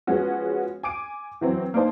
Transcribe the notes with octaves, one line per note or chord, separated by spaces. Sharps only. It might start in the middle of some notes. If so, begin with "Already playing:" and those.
F3 G#3 B3 C#4 F#4
G#5 D6 D7
E3 F#3 C4
A#3 D4 D#4 C5 A5